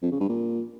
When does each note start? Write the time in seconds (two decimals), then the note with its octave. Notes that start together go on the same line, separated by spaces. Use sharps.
0.03 F2
0.11 C#3
0.20 G2
0.29 A#2